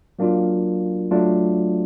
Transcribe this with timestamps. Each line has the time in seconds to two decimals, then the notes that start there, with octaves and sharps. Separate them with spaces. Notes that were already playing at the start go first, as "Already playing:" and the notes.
0.19 F#3 A#3 D4 F4
1.11 F#3 A3 D4 F4